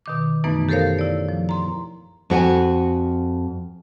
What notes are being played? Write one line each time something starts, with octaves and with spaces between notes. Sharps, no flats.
B2 D#3 D6
F#2 E3 A3 B3 D#4 B4
G4 A4 A#4 C5 C#5 F5
E4 D5
F3
A#5 C6
F2 F#4 G5 G#5